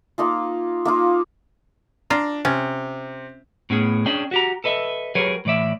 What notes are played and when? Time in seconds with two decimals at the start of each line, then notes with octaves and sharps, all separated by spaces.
0.18 A#3 D#4 F4
0.85 A#3 D#4 F4
2.10 D4 F4 A#5
2.45 C3 C#4
3.70 A2 B3 C#4 G#4
4.06 C#4 D4 G#4 D5 G5
4.31 F#4 G4 A#5
4.64 A4 B4 D#5 E5
5.15 F#3 G4 G#4 A#4 B4 C#5
5.45 A2 E3 D5 E5